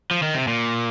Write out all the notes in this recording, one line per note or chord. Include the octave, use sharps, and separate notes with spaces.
F3
D#3
C3
A#2